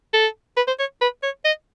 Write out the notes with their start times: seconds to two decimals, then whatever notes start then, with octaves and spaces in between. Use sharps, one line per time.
0.13 A4
0.57 B4
0.67 C5
0.79 C#5
1.01 B4
1.23 C#5
1.45 D#5